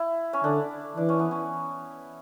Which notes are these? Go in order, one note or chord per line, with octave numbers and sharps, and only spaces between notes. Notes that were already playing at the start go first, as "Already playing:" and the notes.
Already playing: E4
C#4
D3 D4
E3 D4
C#4
B3
C#4